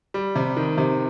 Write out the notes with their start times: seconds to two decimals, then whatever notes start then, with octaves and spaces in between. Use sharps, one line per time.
0.14 G3
0.36 C3
0.57 D#3
0.78 C3